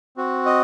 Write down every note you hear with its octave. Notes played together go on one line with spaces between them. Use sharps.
C4 F#4
D#5